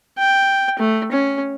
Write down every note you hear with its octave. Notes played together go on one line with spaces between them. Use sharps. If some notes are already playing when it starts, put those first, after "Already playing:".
G5
A3
C#4